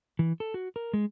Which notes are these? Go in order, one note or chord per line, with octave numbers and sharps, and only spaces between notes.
E3
A4
F#4
A#4
G#3